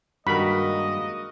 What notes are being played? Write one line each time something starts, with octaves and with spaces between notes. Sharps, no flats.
G2 D#3 G#3 A#3 F#4 A#4 D#5 B5